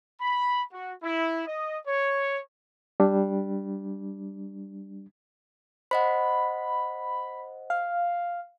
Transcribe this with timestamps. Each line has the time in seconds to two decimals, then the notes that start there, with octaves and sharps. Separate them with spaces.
0.21 B5
0.73 F#4
1.03 E4
1.47 D#5
1.87 C#5
3.00 G3 D4
5.91 C5 D#5 F#5 B5
7.70 F5